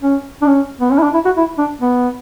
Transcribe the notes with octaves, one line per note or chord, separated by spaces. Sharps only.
C#4
D4
C#4
B3
C#4
E4
D4
E4
F#4
E4
D4
B3